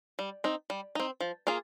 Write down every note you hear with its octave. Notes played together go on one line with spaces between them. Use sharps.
G3
C4 D#4
G3
C4 D#4
F3
A#3 F4 G#4